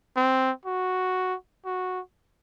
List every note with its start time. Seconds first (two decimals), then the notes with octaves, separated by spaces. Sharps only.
0.16 C4
0.66 F#4
1.66 F#4